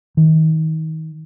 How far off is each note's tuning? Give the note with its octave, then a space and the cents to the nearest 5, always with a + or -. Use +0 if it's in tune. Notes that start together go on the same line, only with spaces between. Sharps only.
D#3 +35